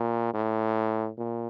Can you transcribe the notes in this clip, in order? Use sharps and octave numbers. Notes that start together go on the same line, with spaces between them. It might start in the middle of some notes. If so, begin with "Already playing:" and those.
Already playing: A#2
A2
A#2